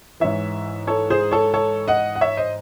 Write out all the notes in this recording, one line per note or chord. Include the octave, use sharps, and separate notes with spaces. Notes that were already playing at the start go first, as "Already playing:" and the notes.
G#2 E3 C#5 E5
A4 C#5
G#4 C5
A4 C#5
A4 C#5
D#5 F#5
F#5
C#5 E5
C5 D#5